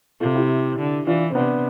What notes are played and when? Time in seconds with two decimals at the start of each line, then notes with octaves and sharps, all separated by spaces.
0.20 C3 F4 A4
0.35 E4 G4
0.79 D3
1.07 E3 D4 F4
1.30 C4
1.35 C3 B3 D4